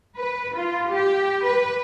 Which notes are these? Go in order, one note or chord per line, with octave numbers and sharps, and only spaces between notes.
B4
F4
G4
B4